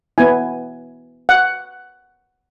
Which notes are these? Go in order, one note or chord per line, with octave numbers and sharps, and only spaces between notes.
B3 E4 G#5
F#5